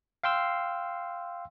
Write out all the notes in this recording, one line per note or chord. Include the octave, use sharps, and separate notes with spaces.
F5 G5 C6 E6